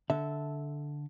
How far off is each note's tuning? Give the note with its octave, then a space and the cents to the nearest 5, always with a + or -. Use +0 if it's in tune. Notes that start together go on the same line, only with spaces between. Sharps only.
D3 -5 A4 +0 E5 -10